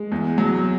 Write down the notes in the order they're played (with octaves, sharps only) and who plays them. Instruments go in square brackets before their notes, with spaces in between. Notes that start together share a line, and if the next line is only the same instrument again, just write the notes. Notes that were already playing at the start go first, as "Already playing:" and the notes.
Already playing: [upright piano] G#3
E2
F#3